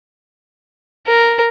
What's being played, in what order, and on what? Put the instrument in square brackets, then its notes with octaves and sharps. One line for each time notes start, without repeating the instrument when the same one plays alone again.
[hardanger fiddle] A#4